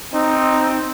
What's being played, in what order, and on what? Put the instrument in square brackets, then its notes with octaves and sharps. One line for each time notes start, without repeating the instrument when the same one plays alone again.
[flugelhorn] C4 [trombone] D#4